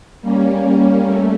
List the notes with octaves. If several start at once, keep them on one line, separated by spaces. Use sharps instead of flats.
G3 A#3 C#4
A3